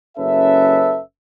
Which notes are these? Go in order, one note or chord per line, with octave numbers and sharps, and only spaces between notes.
F#1 C#4 A4 B4 E5